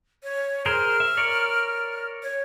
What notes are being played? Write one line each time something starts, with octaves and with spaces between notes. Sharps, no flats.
C#5
G#4 A#4 C5 F6
E5
A#4 C#5 D5
C#5